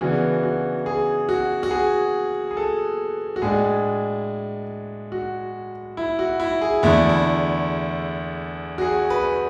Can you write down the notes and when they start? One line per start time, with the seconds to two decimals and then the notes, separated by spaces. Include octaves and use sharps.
0.01 C#3 E3 B3 D4 F#4
0.43 F#4
0.86 G#4
1.29 F#4
1.63 F#4
1.71 G#4
2.51 G#4
2.57 A4
3.36 F#4
3.42 A2 G#3 D4 G#4
5.12 F#4
5.97 E4
6.19 F#4
6.40 E4
6.61 G#4
6.83 E2 D3 A3 E4
7.09 E4
8.78 F#4
8.82 G#4
9.10 B4